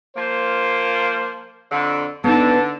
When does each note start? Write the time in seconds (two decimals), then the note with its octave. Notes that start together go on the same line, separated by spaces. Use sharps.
0.16 F3 A#3 C5
1.72 F2 D3
2.24 D3 B3 D#4 A5